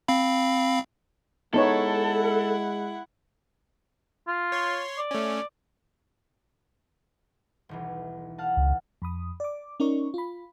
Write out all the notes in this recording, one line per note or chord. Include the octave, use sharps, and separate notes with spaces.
C4 F5 B5
G#3 B3 D#4 E4 A4 C#5 F#5
F4
C#5 C6
D5
A3 C#4
D#1 B1 E3
F5 F#5 A5
C#2
F2 B5 D#6
D5 D6
C#4 D#4 A#4 D5 C#6
F4 B5